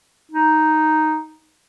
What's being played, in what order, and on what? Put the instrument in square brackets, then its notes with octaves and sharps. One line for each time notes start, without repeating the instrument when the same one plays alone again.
[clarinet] D#4